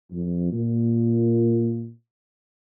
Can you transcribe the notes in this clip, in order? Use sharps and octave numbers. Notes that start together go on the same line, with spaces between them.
F2
A#2